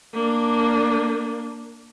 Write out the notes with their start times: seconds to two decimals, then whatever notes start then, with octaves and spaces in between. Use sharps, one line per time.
0.14 A#3 D4